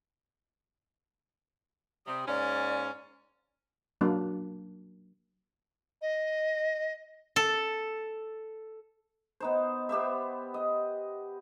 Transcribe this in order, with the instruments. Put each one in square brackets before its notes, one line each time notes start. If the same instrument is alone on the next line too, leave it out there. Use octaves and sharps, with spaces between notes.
[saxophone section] C3 G3 [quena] D#6
[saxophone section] G#2 A#3 C#4 [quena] D5
[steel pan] F#3 A#3 D4
[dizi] D#5
[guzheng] A4
[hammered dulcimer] B3 D#4 C5
B3 G4 C5 E5
D#5